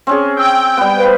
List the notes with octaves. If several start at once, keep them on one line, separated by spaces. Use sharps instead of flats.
C4 C#4 G#4
G5 E6
G3 B3
B4 C5 F5